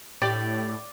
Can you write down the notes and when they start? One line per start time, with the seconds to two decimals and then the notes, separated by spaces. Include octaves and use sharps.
0.22 A2 G4 D5